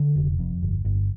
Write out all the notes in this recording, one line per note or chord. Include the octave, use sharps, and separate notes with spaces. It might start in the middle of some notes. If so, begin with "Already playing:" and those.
Already playing: D3
F1
F2
G1
G1